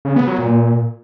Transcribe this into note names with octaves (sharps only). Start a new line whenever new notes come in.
C#3
B3
F#3
A#2